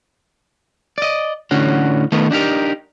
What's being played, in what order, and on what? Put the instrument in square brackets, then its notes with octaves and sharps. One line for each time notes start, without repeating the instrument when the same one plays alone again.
[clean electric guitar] D5 D#5
A2 D3 C#4 F#4
D#3 A3 B3
D4 D#4 G4 A#4